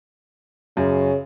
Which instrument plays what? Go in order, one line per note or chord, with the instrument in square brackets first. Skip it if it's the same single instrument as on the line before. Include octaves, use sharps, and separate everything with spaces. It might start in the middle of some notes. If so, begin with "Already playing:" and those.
[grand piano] F#2 [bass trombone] C#3